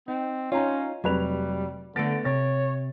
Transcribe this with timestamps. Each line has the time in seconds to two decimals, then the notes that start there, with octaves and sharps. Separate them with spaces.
0.08 C4 D#4
0.52 C#4 D#4 F4 C#5 A#5
1.04 F1 F#3 G3 B4 F7
1.96 D3 A3 B3 A6 A#6 D7
2.25 C3 C#5 A6